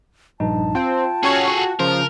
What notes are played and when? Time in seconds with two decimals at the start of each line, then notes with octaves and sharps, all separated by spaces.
0.40 A#1 G2 D#4 A5
0.75 C4 F4 G5
1.23 C#4 F#4 G#4 A4 C#5
1.48 F#4
1.79 C#3 F3 A#4